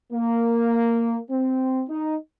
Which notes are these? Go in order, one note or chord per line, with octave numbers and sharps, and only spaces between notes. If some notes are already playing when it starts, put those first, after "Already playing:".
A#3
C4
D#4